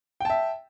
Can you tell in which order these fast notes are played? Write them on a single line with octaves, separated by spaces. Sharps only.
G5 A5 E5